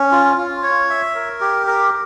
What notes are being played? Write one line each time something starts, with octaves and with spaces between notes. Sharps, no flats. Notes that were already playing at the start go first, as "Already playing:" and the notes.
Already playing: C#4
F4
F4
C#5
E5
A#4
G4
A#4